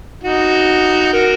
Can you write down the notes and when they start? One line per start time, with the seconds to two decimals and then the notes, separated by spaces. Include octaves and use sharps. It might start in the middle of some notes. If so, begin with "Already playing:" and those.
0.23 D#4 F#4
1.13 F#4 A#4